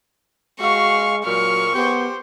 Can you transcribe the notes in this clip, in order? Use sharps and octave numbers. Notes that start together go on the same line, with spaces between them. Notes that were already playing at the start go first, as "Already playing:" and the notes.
G#3 F#4 F5 C#6
A#2 F#3 C#6 F6
B3 G4 C5